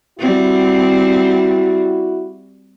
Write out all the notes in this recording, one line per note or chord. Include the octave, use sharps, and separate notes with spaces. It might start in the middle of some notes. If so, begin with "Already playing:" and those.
G3 C4 E4 F#4